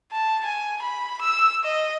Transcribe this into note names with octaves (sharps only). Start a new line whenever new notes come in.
A5
G#5
B5
E6
D#5